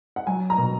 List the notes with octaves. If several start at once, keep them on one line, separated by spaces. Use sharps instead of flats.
F#5
F#3 G#5
A#5
B2